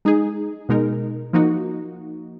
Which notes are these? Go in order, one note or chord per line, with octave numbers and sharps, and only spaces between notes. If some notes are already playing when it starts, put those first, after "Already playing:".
G#3 D#4 G#4
B2 G#3 D#4 A#4
F3 A#3 D#4 F#4